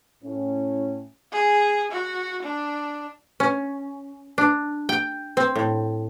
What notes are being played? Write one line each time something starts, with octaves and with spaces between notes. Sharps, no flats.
A2 C#4
G#4
F#4
D4
C#4
D4
G5
C4
A2